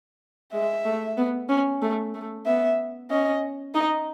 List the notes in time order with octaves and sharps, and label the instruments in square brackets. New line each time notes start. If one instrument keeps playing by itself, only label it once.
[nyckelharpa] G#3 [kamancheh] E5
[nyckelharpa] A3
B3
C#4
A3
A3
[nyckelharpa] B3 [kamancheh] E5
[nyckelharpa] C#4 [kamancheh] D#5
[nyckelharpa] D#4 [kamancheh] D#5